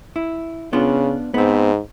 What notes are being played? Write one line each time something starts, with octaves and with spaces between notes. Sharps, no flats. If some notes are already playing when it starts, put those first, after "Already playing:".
E4
C#3 B3 D4 F4
G#2 B3 C4